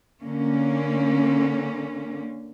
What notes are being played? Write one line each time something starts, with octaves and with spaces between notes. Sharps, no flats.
D3 A#3 C#4